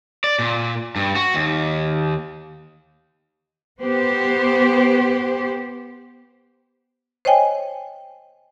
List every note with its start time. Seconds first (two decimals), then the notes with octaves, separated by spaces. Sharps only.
0.24 D5
0.39 A#2
0.96 G2
1.15 F#4
1.34 D#2
3.81 B3 G4 C5
7.25 C5 C#5 D#5 G5 G#5